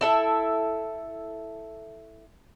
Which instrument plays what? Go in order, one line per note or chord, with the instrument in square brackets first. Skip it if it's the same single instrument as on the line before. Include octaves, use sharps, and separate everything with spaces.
[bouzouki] E4 A4 E5